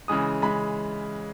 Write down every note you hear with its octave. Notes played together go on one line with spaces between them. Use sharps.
C#3 E3 G#3 D#6
C#3 E3 G#3 B5